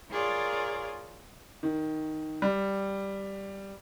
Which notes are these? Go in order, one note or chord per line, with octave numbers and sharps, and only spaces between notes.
F4 G#4 A#4 C#5 D5
D#3
G3